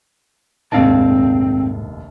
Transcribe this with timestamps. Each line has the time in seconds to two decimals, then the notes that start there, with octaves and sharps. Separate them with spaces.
0.72 F1 A#1 D#2 G#2 C4 F5 A5